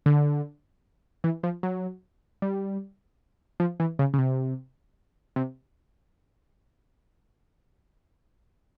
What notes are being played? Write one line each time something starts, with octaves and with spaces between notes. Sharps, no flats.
D3
E3
F3
F#3
G3
F3
E3
C#3
C#3
C3
C3